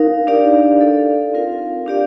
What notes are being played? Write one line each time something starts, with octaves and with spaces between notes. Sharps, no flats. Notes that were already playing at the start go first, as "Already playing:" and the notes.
Already playing: D#4 A#4 F5
D4 G4 D5 F5
D#4 A4 D5 F5
C4 F4 A#4 F5
D4 G4 D5 F5